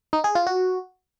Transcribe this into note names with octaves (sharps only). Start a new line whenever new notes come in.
D#4
G#4
F4
F#4